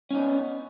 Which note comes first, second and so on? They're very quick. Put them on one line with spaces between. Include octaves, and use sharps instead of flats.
C#4 D#4 B3